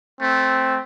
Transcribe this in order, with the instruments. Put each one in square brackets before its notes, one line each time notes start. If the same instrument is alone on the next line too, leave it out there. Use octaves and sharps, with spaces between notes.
[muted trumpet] A3 [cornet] C4